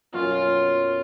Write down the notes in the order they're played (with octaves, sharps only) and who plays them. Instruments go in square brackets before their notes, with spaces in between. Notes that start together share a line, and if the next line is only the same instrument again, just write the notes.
[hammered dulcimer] F#2 B2 F#3 [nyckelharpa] F4